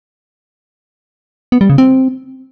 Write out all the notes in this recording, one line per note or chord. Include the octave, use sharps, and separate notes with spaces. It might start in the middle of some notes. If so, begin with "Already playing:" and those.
B3
G3
C#3
C4